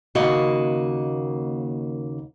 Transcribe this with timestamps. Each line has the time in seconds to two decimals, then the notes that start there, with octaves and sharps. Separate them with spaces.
0.15 D#2 C#3 A#3 F#4 D#5 F5